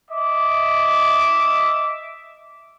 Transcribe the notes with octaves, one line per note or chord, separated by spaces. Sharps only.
D#5 E5 D6